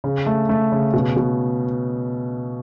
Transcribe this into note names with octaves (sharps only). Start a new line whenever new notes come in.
C#3
A3
A3
C#3
B2
B2